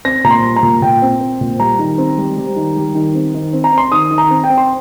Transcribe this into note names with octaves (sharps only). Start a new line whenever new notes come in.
C4 A#6
A#2 A#5
C6
G3
A#5
A#2
A#2 G5
C4
C4
A#2
G3 A#5
D#3
C4
G3
G3
D#3
G3
D#3
C4
D#3
C4
A#5
C4 C6
D#3 D#6
D#3
A#5
C4
G5
C4
C6